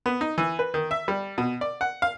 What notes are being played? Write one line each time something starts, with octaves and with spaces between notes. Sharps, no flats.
B3
D#4
E3
B4
D#3
E5
G3
B2
D5
F#5
F5